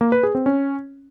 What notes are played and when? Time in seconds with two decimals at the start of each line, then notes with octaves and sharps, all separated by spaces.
0.01 A#3
0.12 B4
0.23 G#4
0.35 C4
0.46 C#4